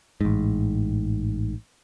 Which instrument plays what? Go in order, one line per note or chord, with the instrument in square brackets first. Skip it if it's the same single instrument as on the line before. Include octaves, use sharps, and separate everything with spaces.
[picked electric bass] A1 G#2